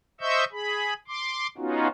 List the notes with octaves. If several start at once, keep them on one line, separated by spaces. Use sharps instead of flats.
C5 D#5 E5 C#6 E6 G6
G#4 B5
C6 D6
B3 C#4 D#4 F4 F#4